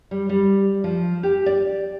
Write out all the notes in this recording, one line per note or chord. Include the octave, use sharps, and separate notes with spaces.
G3
G3
F3
G4
D5